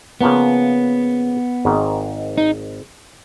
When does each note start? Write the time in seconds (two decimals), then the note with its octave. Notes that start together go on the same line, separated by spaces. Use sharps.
0.21 C#3 F3 A#3 B3 C#4
1.65 G#1 G#2 D#3
2.38 D#4